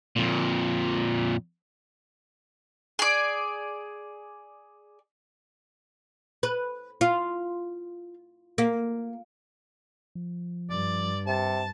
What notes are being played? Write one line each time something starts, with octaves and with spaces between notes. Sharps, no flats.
F2 A#2
G#4 D5
B4
F4
A#3
F3
G2 D5
C3 A5